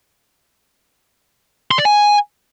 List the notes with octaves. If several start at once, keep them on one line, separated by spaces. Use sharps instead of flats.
C6
D5
G#5